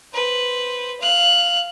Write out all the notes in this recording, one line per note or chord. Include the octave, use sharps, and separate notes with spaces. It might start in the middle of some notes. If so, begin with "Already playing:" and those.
B4 C5
F5 F#6